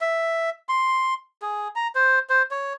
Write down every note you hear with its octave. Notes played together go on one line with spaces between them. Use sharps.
E5
C6
G#4
A#5
C5
C5
C#5